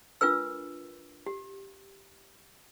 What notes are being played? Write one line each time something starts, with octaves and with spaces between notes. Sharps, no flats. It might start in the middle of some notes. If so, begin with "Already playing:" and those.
D4 F4 A#4 B4 E6
G4